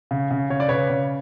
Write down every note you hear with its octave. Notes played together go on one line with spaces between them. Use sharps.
C#3
C#3
C#3 C#5
D5
C#3 B4 C#5
C#3